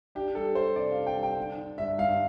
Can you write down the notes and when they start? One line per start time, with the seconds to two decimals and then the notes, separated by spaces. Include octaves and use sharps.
0.15 D4 G4
0.35 G3 A4
0.55 G3 C5
0.76 C3 D5
0.91 F5
0.97 D4
1.06 G5
1.17 G3
1.23 G5
1.37 D3
1.58 D3
1.78 G2 E5
1.98 G2 F5